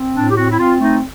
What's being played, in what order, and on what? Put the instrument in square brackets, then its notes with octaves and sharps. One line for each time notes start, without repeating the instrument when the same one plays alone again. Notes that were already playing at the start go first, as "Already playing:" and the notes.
Already playing: [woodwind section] C4
A2 D4
G4
C4 F#4
E4
C4 F4
A3 D#4